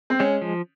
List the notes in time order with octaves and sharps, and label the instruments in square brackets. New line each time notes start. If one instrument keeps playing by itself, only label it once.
[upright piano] C4
[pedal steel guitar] G#3 [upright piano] C#4
[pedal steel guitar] F3